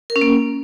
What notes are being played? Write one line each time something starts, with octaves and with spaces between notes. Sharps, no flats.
A#4
C#4
A#3